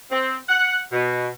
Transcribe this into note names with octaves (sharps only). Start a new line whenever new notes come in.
C4
F#5
B2